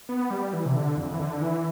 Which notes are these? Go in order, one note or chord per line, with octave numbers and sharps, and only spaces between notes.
B3
G3
E3
C3
D3
F2
E3
D3
E3